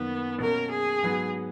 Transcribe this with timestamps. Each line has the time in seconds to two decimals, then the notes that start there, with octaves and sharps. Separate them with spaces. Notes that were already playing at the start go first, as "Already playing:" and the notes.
Already playing: F#2 D#3 A#3 B3
0.40 B2 A#3 C#4 A#4
0.71 G#4
1.03 G#2 F#3 B3 F#4